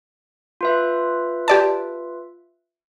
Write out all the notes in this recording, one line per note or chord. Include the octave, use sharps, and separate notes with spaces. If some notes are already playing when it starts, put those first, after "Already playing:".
F4 B4 E5
G4 D5 A5